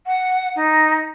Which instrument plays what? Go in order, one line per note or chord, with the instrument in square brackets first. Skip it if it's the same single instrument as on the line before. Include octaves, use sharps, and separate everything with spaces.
[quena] F#5
D#4